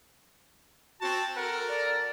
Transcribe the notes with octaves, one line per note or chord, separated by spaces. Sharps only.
C4 F#4 A5
A4 A#4 F#5
D5